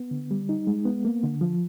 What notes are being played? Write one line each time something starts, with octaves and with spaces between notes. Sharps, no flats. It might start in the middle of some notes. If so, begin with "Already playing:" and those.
Already playing: B3
D3
G3
D#4
G#3
B3
A#3
D3
F3